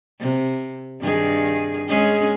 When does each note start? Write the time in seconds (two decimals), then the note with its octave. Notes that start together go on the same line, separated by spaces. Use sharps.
0.20 C3
1.00 G2 D#3 G#4
1.88 G#3 C#4 G#4